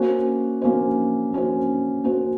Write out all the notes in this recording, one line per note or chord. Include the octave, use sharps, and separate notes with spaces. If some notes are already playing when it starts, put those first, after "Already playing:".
Already playing: A#3 C#4 F#4 C5
A#3 C#4 F#4 C5
A#3 C#4 F#4 C5
A#3 C#4 F#4 C5